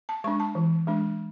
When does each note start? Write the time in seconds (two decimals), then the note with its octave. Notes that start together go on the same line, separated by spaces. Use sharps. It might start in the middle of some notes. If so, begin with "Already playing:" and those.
0.09 A5
0.24 G#3 D4 C#6
0.40 A5
0.55 E3
0.87 G#3 D4